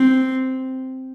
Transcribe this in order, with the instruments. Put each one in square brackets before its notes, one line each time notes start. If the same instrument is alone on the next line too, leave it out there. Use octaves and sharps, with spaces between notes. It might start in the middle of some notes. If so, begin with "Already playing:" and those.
Already playing: [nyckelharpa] C4